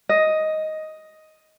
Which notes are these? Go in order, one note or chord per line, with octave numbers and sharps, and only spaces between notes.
D#5